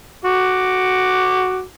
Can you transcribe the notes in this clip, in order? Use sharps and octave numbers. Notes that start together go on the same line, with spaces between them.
F#4 D6